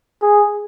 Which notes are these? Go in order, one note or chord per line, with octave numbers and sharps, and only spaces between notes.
G#4